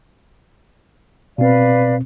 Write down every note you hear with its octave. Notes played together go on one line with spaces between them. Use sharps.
B2 C4 B4 D5 F5